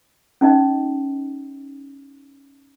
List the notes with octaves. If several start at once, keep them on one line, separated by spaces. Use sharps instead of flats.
C#4 D#4 D#5